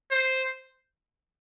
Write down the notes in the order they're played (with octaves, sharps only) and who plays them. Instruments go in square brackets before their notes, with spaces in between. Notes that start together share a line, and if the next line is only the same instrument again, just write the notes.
[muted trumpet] C5